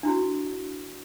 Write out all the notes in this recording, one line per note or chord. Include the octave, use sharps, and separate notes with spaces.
D4 E4 F#4